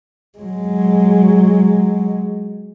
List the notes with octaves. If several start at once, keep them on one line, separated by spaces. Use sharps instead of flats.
F#3 G#3